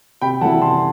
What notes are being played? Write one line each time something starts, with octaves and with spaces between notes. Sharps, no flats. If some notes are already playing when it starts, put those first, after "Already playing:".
C3 G5 B5
E3 A3 E4 F#5 A5
C3 A5 C6